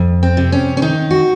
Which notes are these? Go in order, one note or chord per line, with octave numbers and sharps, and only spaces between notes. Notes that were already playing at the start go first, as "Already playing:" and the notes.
Already playing: F2
C4
C3
C#4
C#4
D#3 D#4
F#4